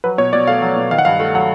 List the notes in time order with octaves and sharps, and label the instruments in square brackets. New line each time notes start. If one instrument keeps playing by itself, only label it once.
[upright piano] F#3 [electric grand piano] B4
[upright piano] B2 [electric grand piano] C#5
[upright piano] B2 [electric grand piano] D5
[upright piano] A3 [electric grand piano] F5
[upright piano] F#3
B2
[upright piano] D#3 [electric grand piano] F5
[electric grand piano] F#5
[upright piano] G2 [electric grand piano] F5
[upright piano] A3
[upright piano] F#3 [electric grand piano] F#5